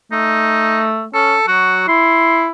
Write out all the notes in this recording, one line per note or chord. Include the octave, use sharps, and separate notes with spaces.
A3 D#4
C#4 A4
F#3 F#4
E4 C6